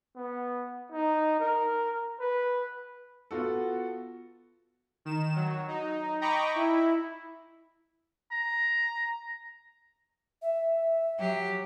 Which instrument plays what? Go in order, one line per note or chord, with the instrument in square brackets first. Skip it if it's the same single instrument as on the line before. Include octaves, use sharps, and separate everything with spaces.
[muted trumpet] B3
D#4
A#4
B4
[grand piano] B3 F4 F#4 A4
[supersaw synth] D#3 E7
F#3
D#4
D#5 G5 A#5 B5 C#6 D6
E4
[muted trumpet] A#5
[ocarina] E5
[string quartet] F#3 G4